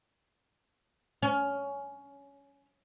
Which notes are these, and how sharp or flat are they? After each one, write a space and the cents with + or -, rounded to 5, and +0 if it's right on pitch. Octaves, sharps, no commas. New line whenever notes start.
C#4 +15